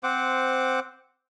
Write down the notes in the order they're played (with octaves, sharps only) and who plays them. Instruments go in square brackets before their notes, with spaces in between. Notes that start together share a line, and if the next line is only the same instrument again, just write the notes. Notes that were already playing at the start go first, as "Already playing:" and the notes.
[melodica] C4 C5 F#5 D6